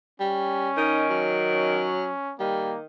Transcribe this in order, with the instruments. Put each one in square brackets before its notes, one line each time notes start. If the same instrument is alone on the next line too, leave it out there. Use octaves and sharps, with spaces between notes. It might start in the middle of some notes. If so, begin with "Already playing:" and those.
[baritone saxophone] G3 [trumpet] C#4
[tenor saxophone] D#3 [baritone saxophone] D#4
[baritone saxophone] F#3
[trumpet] C#4
[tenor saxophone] D#3 [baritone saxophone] G3 [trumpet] A#3